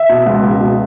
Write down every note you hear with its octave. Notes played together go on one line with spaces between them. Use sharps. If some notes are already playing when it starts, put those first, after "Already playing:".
Already playing: E5
B2
C#2
C#2
B2